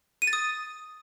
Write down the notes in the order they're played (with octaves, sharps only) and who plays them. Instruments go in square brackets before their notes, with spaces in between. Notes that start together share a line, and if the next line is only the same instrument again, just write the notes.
[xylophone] D#7
A6
D#6